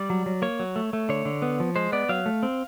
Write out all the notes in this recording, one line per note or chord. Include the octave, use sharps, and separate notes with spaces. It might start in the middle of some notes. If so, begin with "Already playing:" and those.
Already playing: G3 D5
F#3
F#3
A#3 C#5
F#3
A3
A3
D3 C#5
D3
B3
F3
G#3 C5
B3 D5
F#3 F5
A3
C4